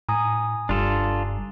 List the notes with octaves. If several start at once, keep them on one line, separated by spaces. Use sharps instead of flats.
A2 G#5 A#5 D#6
F#1 G2 D4 F4 A4